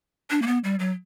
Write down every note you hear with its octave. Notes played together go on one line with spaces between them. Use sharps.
D4
A#3
B3
G3
F#3